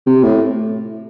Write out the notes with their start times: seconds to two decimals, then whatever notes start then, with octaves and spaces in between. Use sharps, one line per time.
0.06 C3
0.23 A2